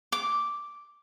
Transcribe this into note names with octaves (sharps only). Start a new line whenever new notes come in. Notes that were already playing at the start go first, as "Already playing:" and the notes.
D6